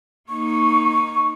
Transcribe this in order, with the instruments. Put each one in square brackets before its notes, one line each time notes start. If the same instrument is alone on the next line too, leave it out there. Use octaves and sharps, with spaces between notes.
[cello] A#3 D#4 [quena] C#6